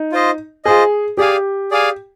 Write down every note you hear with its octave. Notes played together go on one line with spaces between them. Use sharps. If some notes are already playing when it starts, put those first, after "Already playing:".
Already playing: D#4
F4 C5 D#5
F4 G#4 C5 D#5
G4 G#4 D5 F5 G#5
G#4 D5 F5 G#5